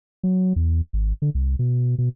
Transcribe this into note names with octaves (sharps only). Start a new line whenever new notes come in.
F#3
E2
G#1
D3
C2
B2
B2